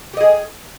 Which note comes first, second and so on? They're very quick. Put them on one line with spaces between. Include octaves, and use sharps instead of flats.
G4 D#5 G#4